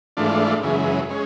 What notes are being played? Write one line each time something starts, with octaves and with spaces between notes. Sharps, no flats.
G#2 E3 A3 D4 F4
F#2 C#3 E3 G#3
G#3 C#4